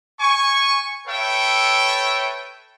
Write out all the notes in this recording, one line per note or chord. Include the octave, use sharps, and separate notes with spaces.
G#5 C#6
A4 B4 C#5 E5 G5